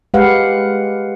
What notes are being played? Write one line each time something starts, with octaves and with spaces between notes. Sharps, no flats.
G#3 G4 B4 F5 F#5